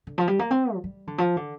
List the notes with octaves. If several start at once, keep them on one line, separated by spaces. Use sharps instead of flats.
D3
F3
G3
A#3
C4
F3
G3
D3
F3
D3